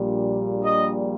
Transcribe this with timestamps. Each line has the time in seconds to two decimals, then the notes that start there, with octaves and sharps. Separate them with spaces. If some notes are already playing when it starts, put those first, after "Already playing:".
Already playing: A#1 A#2 G3
0.64 D#5